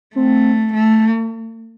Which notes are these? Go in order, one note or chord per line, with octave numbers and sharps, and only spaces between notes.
A3 C4
A3